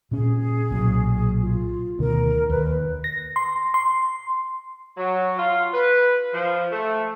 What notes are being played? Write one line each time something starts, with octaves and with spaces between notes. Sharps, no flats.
A#2 C#4 G#4
B1 A#2 F#3
F4
D2 B2 D#3 A#4
D#2 B4
A#6
C6
C6
F#3
F4
B4
F3
A3